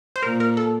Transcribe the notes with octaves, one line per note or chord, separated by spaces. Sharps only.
C5
A#2 A#4
A#4
A4